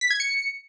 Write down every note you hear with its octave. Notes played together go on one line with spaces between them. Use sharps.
B6
G#6
C#7